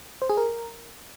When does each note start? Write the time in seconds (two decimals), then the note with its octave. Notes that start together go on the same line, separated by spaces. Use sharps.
0.22 C5
0.30 G#4
0.37 A#4